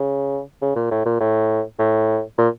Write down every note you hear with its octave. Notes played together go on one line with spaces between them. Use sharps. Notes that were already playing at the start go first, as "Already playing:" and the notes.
Already playing: C#3
C#3
A#2
A2
A#2
A2
A2
A#2